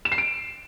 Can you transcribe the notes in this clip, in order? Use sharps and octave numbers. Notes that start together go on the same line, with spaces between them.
E7
C7
D7